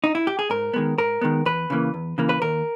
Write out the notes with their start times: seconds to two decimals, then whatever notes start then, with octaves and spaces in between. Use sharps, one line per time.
0.04 D#4
0.15 E4
0.27 G4
0.39 G#4
0.50 G#2 A#4
0.74 D#3 G#3 B3
0.98 G#2 A#4
1.21 D#3 G#3 B3
1.45 E2 B4
1.70 C#3 E3 A#3
1.94 E2
2.18 C#3 E3 A#3
2.29 B4
2.42 D#2 A#4